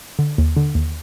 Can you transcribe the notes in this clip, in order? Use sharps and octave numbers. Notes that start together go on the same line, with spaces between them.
D3
D#2
D3
D#2